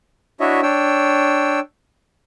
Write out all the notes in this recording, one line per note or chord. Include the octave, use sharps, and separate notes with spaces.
D4 E4 F#4 C#5 D#5 E5
D4 C#5 G5 E6